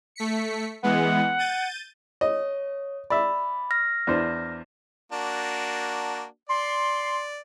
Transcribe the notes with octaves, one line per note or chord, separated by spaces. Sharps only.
A3 B6 C#7
E3 G#3 B3 F#5
G6 A6 D#7
C#5 D#5
D5 E5 B5
F6 A#6
E2 D4 C5
A#3 D4 F#4
D5 C6